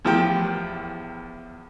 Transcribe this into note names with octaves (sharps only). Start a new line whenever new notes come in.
E2 A2 F3 G4 A#4 G5